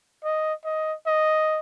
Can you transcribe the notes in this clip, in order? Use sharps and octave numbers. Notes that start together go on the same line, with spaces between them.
D#5
D#5
D#5